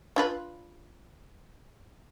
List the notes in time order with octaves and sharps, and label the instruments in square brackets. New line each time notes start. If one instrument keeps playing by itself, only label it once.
[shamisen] D4 F4 B4